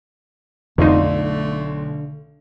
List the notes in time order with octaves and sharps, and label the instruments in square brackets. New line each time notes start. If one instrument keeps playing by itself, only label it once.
[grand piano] B1 F4 C6 [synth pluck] F2 D#4 [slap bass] D3 [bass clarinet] A3